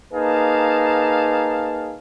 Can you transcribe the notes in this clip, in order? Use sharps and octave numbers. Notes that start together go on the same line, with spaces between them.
A#3 D#4 G#4 B4 F5 A5